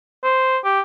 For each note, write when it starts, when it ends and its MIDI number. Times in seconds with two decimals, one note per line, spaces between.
0.23 0.58 72
0.64 0.81 67